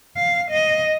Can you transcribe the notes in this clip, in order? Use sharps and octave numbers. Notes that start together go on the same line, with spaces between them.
F5
D#5